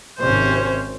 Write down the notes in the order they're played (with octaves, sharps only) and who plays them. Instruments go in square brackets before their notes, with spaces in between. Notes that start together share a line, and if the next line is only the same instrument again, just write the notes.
[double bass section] G#1 C3 [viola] C#4 C5